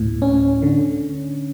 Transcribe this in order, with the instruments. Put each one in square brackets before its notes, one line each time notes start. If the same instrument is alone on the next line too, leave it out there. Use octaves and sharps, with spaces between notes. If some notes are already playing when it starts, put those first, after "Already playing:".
Already playing: [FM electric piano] D2 A2
C#4
D3